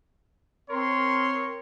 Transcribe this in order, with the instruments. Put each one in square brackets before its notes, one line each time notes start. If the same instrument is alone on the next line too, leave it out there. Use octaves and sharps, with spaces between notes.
[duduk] C4 [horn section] A#4 [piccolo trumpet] C#5 [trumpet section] C6